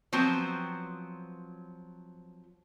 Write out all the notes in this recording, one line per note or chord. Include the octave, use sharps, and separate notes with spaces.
F3 F#3 B3 C4